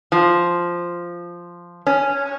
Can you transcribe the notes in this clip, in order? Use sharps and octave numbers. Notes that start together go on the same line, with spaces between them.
F3
C#4